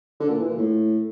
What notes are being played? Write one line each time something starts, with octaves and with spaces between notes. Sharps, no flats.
D3
A#2
E3
A#2
A2